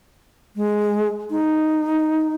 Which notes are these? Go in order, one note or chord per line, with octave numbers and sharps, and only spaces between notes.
G#3
D#4